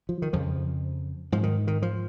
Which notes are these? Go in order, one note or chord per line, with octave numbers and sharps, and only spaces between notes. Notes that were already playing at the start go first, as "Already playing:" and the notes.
F3
D#3
F2 C#3 F3
G#2 F3
D#3
D#3
F3